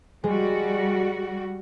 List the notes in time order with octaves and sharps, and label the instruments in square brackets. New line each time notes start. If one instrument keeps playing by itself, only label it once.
[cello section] G3 F#4 [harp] G#3